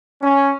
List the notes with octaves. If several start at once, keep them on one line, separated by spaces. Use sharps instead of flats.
C#4